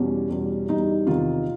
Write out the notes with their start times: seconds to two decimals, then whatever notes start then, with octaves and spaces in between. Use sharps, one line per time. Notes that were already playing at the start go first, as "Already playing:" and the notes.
Already playing: E2 B2 G3 C#4
0.29 E2 B2 G3
0.68 E2 B2 G3 D#4
1.07 E2 C3 D#3 F4